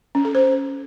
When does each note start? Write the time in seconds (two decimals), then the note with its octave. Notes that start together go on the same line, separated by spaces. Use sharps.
0.15 C#4
0.25 A4
0.35 C5